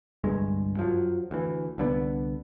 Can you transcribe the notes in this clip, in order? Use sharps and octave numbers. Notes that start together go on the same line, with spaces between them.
G1 C2 G2 G#3
F#2 F3 F#3
D2 E3
C2 D3 B3